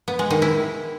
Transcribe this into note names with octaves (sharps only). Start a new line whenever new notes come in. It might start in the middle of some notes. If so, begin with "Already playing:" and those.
B3
G#3
D#3
E4